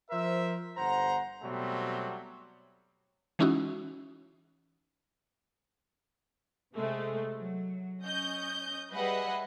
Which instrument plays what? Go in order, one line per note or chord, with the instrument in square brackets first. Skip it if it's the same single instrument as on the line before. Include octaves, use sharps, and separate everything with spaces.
[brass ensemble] F3 A#4 C5 E5
G1 C5 F#5 A#5
B2 F#3 G3 A3 C4
[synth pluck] E3 G#3 C#4 D#4 E4 F#4
[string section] C3 G#3 A3
F#3
C#4 D#5 G6
G3 G#4 B4 D#5 E5 F#5